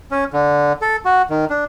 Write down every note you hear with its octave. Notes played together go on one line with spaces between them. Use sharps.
C#4
D3
A4
F#4
D#3
D4